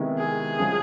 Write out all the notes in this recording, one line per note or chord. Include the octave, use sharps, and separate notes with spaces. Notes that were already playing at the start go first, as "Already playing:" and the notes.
Already playing: C3 D#3 G#3 B3 E4
G#4
C#3 F3 G#3